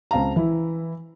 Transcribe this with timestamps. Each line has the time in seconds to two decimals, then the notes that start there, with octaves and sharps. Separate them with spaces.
0.11 C#2 C4 F5 A5 A#5
0.36 E3 E4